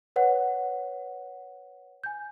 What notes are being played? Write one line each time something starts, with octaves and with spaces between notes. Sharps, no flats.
B4 C#5 F#5
G#5 G6